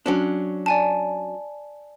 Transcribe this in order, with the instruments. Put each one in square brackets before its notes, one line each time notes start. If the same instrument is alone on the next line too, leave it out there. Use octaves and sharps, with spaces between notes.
[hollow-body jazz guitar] F#3 C#4 D4
[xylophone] D5 G#5 A5